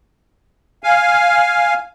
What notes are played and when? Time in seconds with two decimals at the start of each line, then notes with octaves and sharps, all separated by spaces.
0.84 F5 G#5